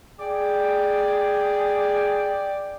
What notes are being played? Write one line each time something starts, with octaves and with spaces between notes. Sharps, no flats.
G#4 D5 G5